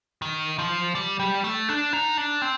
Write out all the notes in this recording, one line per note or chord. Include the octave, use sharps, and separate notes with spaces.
D#3
F3
G3
G3
A3
D4
D#4
D4
C4